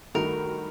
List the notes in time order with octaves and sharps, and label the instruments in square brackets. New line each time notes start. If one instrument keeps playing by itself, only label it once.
[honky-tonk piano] G2 D#3 A3 D#4 F#4 [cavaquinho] A#4